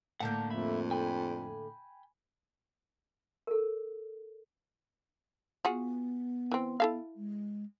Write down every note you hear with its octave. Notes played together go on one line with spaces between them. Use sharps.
A2 D3 A#3 F#5 A5 G6
F2 E5 B5
G5 G#5 B5
A4 A#4
B3 F4 F#4 G#4
E3 C4
E4 A4 F5
G#3